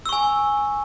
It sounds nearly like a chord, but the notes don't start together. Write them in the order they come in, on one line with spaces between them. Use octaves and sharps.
E6 C#6 G#5